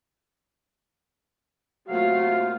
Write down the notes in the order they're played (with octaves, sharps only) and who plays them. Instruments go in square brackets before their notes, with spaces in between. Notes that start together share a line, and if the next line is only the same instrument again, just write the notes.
[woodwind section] C3 A3 F5 [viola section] F#3 A#3 F4 [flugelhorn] F#4